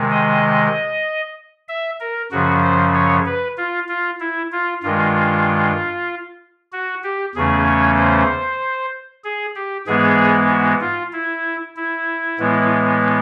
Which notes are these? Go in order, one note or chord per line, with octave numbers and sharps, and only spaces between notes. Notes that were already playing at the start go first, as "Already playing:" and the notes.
Already playing: C3 D#3 G#3
D#5
E5
A#4
F#2 C#3 F3 F#4
C5
C#5
B4
F4
F4
E4
F4
G2 D#3 G#3 F4
F#4
G4
E2 C#3 E3 A3 C#4 G#4
C#5
C5
G#4
G4
G#2 E3 G#3 B3 G#4
F#4
F4
E4
E4
A2 E3 G#3 B3